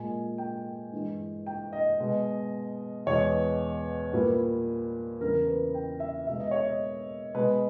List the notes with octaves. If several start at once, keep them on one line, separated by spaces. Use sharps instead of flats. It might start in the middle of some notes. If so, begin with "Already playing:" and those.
Already playing: A#2 G#3 G#5
G5
G2 E3 G#3
G5
D#5
B2 G#3
E2 B2 G#3 C#5
A#2 G3 B4
E2 C#3 E3 G3 A#4
B4
G5
E5
B2 G#3 E5
D#5
C#5
D#5
B2 G#3 B4